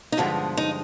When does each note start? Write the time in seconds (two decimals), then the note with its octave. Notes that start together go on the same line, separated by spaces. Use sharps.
0.12 D#4
0.17 G2 D3 F3 G#3 B3 E4
0.57 D#4